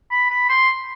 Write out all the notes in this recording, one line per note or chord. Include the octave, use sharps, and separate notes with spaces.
B5
B5
C6